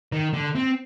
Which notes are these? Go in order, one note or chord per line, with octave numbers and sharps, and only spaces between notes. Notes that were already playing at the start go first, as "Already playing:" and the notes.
D#3
D3
C4